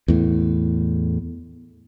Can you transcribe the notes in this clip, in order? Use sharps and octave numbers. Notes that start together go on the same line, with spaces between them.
E2 A2